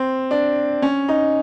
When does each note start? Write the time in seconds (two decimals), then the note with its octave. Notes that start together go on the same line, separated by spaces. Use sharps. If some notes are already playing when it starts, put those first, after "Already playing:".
Already playing: C4
0.31 D4
0.82 C#4
1.08 D#4